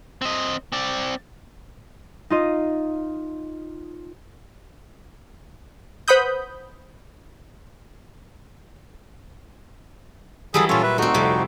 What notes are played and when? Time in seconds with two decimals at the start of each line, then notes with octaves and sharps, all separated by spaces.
0.22 C4 D#5
0.73 C4 D5
2.30 D#4 F4 D#5
6.08 B4 C5 F#5 B5 D#6 G6
10.54 E3 F#3 G3 G#4 A4
10.69 A#2 C#4 F4 A4 C#5
10.83 B4 E5
10.98 D2 A3 C4 D#4 F#4
11.14 F2 C3 G3